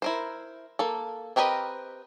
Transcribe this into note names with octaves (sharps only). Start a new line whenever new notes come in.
E4 A#4 C5
A#3 A4
C4 G4 A#4 B4 D#5